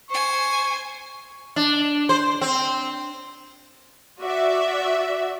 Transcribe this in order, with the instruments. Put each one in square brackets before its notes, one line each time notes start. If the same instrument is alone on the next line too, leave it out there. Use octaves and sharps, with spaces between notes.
[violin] C5 G#5 [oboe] C#6
[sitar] D4
C5
C4
[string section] F#4 D5 E5